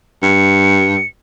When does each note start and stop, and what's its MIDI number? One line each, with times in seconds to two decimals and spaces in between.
0.23 1.02 43
0.23 1.07 97